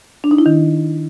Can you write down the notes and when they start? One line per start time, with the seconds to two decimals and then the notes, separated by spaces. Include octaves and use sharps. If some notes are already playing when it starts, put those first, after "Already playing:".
0.24 D4
0.31 D#4
0.38 E4
0.46 D#3